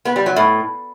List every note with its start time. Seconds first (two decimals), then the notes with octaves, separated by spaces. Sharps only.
0.05 B3
0.16 G3
0.26 F#3
0.36 A2